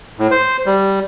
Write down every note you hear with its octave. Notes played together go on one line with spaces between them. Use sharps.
A2
C5
G3